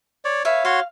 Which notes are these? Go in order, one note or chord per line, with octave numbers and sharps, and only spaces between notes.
C#5 D5
B4 C#5 E5 F5
F#4 C#5 F5 C6